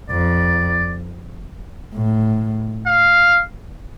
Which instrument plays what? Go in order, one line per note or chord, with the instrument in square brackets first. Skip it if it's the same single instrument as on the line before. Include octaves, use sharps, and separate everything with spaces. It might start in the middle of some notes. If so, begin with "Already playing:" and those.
[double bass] F2 [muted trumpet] D5
[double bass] A2
[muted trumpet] F5